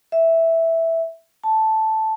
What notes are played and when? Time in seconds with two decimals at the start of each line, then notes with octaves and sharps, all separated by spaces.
0.12 E5
1.44 A5